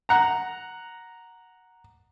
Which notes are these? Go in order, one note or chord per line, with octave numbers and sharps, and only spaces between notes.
F#5 A#5